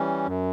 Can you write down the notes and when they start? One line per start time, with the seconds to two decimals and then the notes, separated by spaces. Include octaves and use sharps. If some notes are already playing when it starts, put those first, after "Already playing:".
Already playing: E3 G3 C#4
0.28 F#2